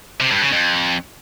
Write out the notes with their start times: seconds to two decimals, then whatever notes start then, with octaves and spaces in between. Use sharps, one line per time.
0.20 C3
0.31 G2
0.42 C#3
0.52 F2